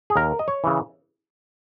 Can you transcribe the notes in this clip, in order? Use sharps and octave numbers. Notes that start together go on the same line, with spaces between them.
G#4
D#2 A#4
D#5
C#5
C#3 E3